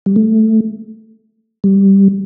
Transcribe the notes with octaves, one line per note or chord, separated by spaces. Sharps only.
G3
A3
G3